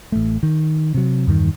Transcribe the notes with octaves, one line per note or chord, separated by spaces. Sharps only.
A1 A3
D#3
C3 F#3
E2 G2 D#3